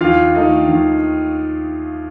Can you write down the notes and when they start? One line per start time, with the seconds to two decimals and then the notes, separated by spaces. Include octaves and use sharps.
0.01 D#2 F4 F5
0.35 D#3 A3 D#4
0.69 D#2